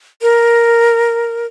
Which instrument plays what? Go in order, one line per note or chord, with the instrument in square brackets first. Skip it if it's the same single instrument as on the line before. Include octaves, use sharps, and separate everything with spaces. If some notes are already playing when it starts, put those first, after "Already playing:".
[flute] A#4